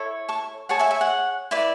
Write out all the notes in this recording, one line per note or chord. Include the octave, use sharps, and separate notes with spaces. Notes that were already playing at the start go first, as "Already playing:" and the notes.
Already playing: E4 A4 C#5
A5 C#6
G#4 C#5 F#5 A5
E5 G#5
E5 G#5
F#5
E4 B4 D5